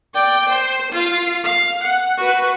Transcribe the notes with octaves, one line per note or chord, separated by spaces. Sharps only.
D5 G5
C5
F4 F5
F5
F#5
F#4 B4